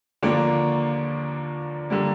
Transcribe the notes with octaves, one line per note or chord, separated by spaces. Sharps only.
D#2 D3 F3 A#3 D4
D3 G3 A#3